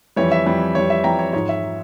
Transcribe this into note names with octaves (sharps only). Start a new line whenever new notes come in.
F2 E3 G3 C#5
E5
F2 E3 G3
F2 E3 G3 C#5
E5
F2 E3 G3 G5 A#5
C#5
G#2 F3 C#5
E5
F3